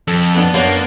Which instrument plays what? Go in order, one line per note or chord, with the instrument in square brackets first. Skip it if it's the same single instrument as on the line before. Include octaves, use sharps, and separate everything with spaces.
[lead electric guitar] F2 [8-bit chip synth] A4
[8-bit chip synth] B3 D4
[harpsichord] F#2 [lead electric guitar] A#3